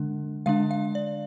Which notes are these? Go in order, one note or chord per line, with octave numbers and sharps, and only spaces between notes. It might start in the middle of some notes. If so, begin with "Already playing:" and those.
Already playing: D3 G#3 D4
D3 G#3 D4 F5
F5
D5